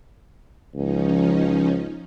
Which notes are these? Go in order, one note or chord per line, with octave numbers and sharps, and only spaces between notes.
C#2 F3 C#4 D#4